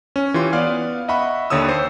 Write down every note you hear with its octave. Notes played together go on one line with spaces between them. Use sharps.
C#4
E3 F4 G4 C6
B3 D5 F5 F6
D#5 E5 F#5 B5 C#6
D#2 D3 C#5 D#6 E6
C5